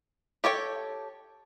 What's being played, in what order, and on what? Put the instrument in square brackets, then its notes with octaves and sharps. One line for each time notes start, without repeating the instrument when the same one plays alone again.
[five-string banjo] G4 A4 C#5 G5